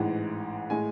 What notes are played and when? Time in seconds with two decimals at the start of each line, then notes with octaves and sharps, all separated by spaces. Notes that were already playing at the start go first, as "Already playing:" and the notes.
Already playing: A1 G#2 E3 G#3 F#5
0.70 A2 G#3 G#5